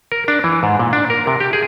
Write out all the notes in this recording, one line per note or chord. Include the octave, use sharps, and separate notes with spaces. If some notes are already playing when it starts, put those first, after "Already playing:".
A#4
D4
E3
G#2
A#2
D4
A#4
C3
G4
G#4